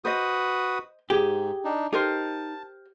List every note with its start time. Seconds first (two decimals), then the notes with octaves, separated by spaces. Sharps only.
0.05 F#4 B4 C5 D#5 D#6
1.10 G#2 G4 G#4
1.65 D4 D#4
1.93 D#4 G4 A#4 C5 A5